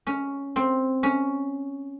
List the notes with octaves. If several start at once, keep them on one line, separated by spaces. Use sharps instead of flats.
C#4
C4
C#4